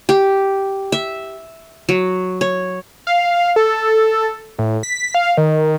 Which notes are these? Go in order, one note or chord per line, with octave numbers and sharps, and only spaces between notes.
G4
E5
F#3
C#5
F5
A4
A2
B6
F5
D#3